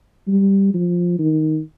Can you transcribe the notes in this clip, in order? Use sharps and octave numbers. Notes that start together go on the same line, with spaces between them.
G3
F3
D#3